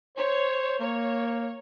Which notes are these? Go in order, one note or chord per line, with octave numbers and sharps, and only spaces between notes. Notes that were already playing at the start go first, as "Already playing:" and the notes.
C5 C#5
A#3 C#5